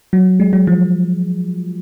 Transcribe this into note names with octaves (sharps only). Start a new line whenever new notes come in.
F#3
G#3
F#3
F3